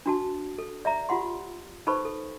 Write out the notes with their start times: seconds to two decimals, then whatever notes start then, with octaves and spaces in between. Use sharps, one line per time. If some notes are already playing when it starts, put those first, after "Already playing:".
0.06 D4 F#4 A5
0.58 A4
0.85 D5 E5 A#5
1.09 F4 G4 F#5 C6
1.87 D#4 A4 B4 C5 B5 C#6
2.05 A4